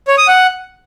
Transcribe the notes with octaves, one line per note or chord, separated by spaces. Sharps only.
C#5
D#6
F#5